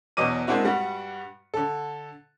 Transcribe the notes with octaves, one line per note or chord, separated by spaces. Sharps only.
E2 B2 F#3 D#5 D6 D#7
G#3 A#3 C4 D4 E4 F#4
G2 G3 F#4 F#5
D3 A4